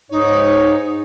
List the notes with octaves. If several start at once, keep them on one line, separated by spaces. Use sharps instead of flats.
G#2 D#4 C#5